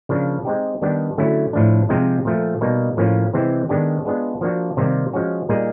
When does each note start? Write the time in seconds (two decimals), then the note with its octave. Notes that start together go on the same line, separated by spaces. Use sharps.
0.09 C#3 F3 A#3 D4
0.45 G#3 C4 D#4 G4
0.82 D#3 G3 B3 D4 G4
1.18 D3 F#3 A3 C#4 E4
1.53 A2 F3 A3 D4
1.89 C3 F3 G#3 C4 D#4
2.25 A#2 F3 A3
2.61 B2 G3 A#3 D#4
2.97 A2 F3 A#3 C#4 F4
3.34 C3 E3 G#3 C4
3.69 D#3 G#3 B3 D4 G4
4.05 G#3 B3 D4 F4 G#4
4.41 F3 A#3 D4 F#4
4.77 C3 D#3 G3 A#3
5.13 F3 G#3 C#4 F#4
5.49 A#2 G3 A#3 D#4 G#4